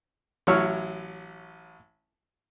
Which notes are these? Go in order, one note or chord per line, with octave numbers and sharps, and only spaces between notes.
A1 F#3 E4 C#5 E6 F6